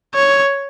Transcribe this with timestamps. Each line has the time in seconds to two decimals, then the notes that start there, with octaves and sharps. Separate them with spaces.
0.15 C#5